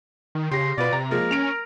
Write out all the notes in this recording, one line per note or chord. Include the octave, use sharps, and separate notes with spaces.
D#3
C#3 G4 C6 A#6
B2 F4 B4 D5
C3 A#5
F3 G#3 A#3 A#4
C#4 D7 F7